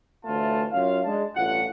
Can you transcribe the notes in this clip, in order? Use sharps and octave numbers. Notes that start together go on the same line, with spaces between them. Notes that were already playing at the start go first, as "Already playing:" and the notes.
D2 A2 E3 A3 F4 A5
F#2 C#4 F4 F5
G#3 D4 A5
A1 G2 A3 F4 F#5